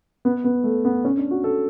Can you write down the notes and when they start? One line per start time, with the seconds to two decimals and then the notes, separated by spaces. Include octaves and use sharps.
0.25 B3
0.44 B3
0.64 A3
0.85 B3
1.05 C#4
1.17 D4
1.31 F#4
1.44 A4